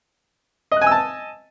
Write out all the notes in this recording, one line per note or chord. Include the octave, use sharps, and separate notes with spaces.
D#5 G#5 A5 E6 F#6